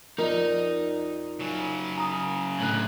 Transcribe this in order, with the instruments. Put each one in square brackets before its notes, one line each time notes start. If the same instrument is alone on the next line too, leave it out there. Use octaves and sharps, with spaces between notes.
[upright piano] F2 D5 [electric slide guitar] D#4 D#5 [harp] A#4
[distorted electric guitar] C#3 F#3
[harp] A#5 D#6
[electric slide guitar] A2 D3 [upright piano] F#6 F#7